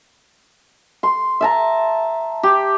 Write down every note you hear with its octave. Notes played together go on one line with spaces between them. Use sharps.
C6
E5 A5 A#5
G4